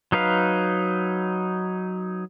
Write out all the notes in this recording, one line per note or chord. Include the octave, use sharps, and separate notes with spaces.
F#3 D#4 B4 F5